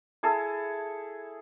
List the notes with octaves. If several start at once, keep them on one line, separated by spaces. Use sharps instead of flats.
E4 G#4 A4